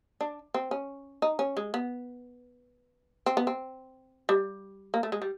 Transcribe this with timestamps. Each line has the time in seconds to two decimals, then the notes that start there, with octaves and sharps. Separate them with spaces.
0.21 D4
0.54 C4
0.71 C#4
1.22 D#4
1.39 C#4
1.57 G#3
1.74 B3
3.26 C4
3.37 B3
3.47 C4
4.29 G3
4.94 A#3
5.03 A3
5.12 G#3
5.22 G3